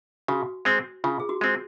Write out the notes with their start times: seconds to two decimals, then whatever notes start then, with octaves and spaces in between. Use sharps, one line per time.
0.28 C#3 F#4
0.65 G#3 C4
1.04 C#3 F4
1.20 G#4
1.29 F#4
1.41 G#3 C4